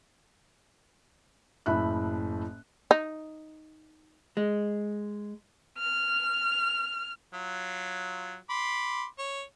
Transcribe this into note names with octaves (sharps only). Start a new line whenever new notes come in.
F#1 A2 E5 B5 F#6
D#4
G#3
F6
F#3 F4
B5 C6 D6
C#5